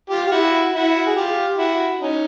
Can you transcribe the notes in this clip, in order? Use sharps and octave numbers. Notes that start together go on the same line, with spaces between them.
F4 G4
G4
E4 F#4
E4 F#4
G#4
F4 G4
E4 F#4
C#4 D#4